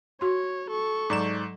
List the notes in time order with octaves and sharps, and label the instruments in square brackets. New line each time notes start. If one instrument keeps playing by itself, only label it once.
[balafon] F#4 C6 [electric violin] C#5
[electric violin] A4 C#6
[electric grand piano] G#2 D5 E7 [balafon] F#3 A#5 D6